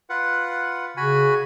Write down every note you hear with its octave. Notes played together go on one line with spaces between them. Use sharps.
F4 B4 F#5
C#3 F#4 G#5 B5